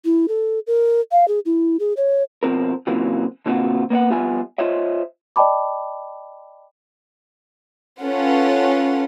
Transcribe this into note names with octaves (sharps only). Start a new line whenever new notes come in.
E4
A4
A#4
F5
G#4
E4
G#4
C#5
B2 F3 C4 A#4
C#3 E3 F#3 A#3 C4 F4
B2 D3 A#3 C4 F4 F#4
A#3 B3 D5 F#5
F2 G3 B3 F4 E5 G#5
F4 C5 C#5 D#5 E5
D5 D#5 G5 A5 B5 D6
C#4 F4 A4 B4 F#5